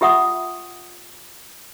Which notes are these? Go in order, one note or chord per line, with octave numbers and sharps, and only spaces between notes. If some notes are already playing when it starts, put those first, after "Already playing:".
F4 G4 E5 F#5 D#6